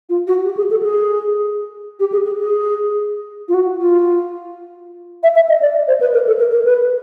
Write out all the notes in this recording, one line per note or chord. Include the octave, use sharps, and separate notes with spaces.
F4
F#4
G4
G#4
A4
G#4
G4
G#4
G#4
G#4
F4
F#4
F4
E5
E5
D#5
D5
C5
B4
A#4
A4
A#4
A#4
B4